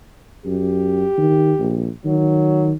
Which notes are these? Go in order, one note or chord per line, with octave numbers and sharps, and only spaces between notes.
F#2 G4
D#3
A#1
D#3 F#3